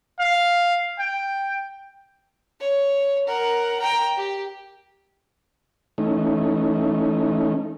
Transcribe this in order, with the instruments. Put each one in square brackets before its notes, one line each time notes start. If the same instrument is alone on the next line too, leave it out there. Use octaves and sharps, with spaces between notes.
[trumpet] F5
G5
[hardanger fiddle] C#5
A#4 F#5
G5 A#5
G4
[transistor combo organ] E3 A3 C#4 D#4